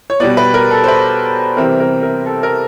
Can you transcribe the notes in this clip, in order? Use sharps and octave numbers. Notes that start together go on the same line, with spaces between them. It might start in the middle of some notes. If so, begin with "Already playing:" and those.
C#5
B2 G3 B3 D5
B4
A#4
A4
C5
B4
C3 E3 G3 C4 A#4
A#4
A#4
A4
A#4